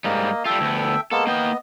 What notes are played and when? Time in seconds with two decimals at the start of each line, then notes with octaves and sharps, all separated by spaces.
0.04 G#2 G3 A#3 D#5
0.45 G3 F4 A4 E5 G5
0.61 D2 B3
1.12 G#3 A#3 B3 A4
1.27 A#3 B3 D#5 G5